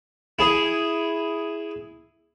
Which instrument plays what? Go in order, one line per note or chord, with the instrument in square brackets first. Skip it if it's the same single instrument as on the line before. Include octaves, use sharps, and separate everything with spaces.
[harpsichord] E4 G#4